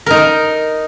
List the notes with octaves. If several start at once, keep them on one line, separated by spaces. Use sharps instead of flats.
D#4 A#4